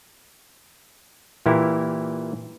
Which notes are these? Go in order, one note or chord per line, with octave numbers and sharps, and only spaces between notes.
A#2 E3 A#3 E4 G4